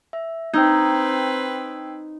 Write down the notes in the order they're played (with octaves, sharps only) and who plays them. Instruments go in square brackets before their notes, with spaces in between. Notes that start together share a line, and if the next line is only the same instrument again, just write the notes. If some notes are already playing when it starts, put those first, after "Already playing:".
[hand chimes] E5
[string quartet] C4 B4 [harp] D#4 [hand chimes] G5 E6 G#6